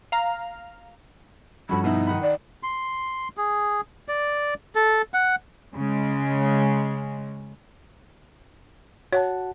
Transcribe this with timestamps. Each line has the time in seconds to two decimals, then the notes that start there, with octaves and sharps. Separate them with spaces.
0.12 F5 A#5 F6
1.69 G2 F3 G3 C#4 F#4 A4 B5
1.84 B2 B3 D#4 E4
2.07 D#3 F#5 B5
2.22 D5
2.63 C6
3.37 G#4
4.08 D5
4.75 A4
5.14 F#5
5.75 C#3 G#3
9.13 F#4 C#5 F#5 A5